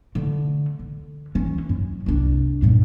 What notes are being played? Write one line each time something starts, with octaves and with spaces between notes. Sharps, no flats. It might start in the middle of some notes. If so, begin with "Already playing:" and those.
D3 A3
D3
E3 C#4
F#2
C2 D4
G2 A#2